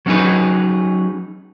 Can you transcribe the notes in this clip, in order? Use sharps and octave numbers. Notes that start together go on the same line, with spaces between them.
F#3 B3 C#4 D#4 G#4 B4